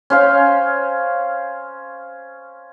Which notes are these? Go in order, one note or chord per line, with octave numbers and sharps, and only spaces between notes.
C#4 C5 F5